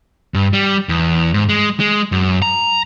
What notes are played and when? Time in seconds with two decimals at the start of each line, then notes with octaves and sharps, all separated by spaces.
0.34 G2
0.53 G3
0.89 E2
1.34 G#2
1.49 G#3
1.80 G#3
2.12 F#2
2.42 A#5